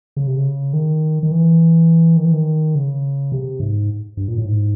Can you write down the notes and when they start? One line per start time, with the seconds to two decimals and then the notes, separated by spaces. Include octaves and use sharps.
0.17 C#3
0.27 C3
0.37 C#3
0.73 D#3
1.23 D#3
1.32 E3
2.17 D#3
2.25 E3
2.32 D#3
2.75 C#3
3.32 C3
3.60 G#2
4.17 G2
4.28 A#2
4.38 A2
4.46 G#2